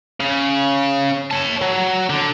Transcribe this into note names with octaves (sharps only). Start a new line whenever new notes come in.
C#3
C#5 A5
F#3
D3